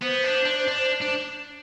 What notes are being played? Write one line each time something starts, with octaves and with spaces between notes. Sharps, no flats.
B3 C5
D4
D4
D4
D4